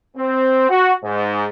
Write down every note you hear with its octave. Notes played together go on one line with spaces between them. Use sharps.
C4
F#4
G#2